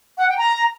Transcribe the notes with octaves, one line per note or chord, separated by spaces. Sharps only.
F#5
G5
A#5